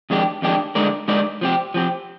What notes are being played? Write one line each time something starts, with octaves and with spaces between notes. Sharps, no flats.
F2 D#3 G#3 D4 G4
F2 D#3 G#3 D4 G4
D3 G#3 D#4 A#4 D5
D3 G#3 D#4 A#4 D5
F3 C4 G4
F3 C4 G4